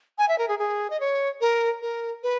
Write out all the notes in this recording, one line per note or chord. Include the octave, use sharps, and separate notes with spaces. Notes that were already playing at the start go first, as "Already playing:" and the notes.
G#5
E5
A#4
G#4
G#4
D#5
C#5
A#4
A#4
B4